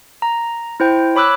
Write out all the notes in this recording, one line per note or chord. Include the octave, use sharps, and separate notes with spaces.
A#5
E4 C5 G5
C#5 B5 D6 E6 F#6